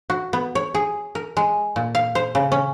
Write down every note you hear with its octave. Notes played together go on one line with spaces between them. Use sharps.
F#4
B3
C#5
G#4
A#4
G#3
A#2
F5
C5
C#3
C#4